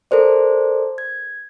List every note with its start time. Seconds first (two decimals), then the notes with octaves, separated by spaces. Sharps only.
0.11 A4 A#4 C5 D5
0.98 G#6